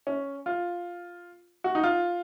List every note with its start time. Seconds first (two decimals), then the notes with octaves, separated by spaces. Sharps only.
0.07 C#4
0.46 F4
1.64 F#4
1.75 D#4
1.83 F4